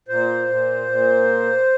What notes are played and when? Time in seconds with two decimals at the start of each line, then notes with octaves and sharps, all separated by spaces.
0.08 A#2 C5
0.48 A#2
0.88 A#2